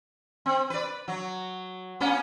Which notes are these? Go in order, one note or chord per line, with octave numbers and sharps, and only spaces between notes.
C4
B4 D5
F#3
A#3 B3 C#4